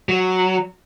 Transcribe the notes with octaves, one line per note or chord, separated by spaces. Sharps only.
F#3